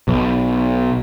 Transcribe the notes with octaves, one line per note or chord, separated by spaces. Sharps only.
B1